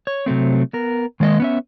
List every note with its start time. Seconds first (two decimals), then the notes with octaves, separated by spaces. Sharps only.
0.07 C#5
0.26 C3 F#3 A3 C4
0.73 B3 A#4
1.20 D#3 G#3 A#3 D5 D#5
1.40 B3 C#4 E5